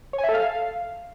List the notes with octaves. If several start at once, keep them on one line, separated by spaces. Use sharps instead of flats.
C#5
G#5
E5
A4
F5